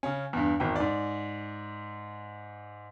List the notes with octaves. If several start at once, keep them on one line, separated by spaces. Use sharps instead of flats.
C#3 C#4
E2 G2
G#1 E2 G5
G#2 D5